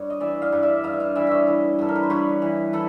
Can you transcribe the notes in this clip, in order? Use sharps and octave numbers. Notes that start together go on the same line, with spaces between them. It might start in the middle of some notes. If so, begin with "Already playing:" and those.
Already playing: G2 C#5
D#5
E3 D5 E5
D#5 F5
G2
D5 E5
G2 D#5 F5
E5
D#5 F5
E3 D5 E5
C#5 D#5 E5
E3
G2 A4
A#4
B4
C5
G2 B4 C#5
E3
E3 A4 B4